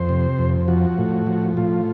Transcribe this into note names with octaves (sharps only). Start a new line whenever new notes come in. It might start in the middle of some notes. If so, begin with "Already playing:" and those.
Already playing: F2 C5
C3
F2
F3 F#4
A2
F3
A2 F4